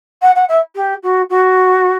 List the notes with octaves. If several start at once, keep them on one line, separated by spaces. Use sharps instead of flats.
F#5
F#5
E5
G4
F#4
F#4